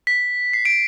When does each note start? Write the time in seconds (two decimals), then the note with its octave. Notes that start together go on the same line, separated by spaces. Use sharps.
0.07 B6
0.53 C7
0.65 D7